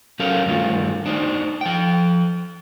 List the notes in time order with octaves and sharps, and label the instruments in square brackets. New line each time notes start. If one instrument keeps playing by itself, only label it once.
[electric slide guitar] F#3 C#4 G4 A4 A#4 F5
G2 D3 D#3 A3 F4
D4 D#4 C5
F3 G5